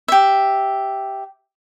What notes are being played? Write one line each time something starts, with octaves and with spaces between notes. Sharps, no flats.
G4 E5